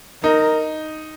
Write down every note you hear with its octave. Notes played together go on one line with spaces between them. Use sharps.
D#4 A#4